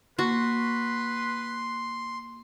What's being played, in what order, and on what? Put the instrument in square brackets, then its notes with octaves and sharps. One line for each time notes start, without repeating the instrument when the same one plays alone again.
[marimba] A#3 C#6 [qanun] F#4 [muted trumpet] B4 [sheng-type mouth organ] C6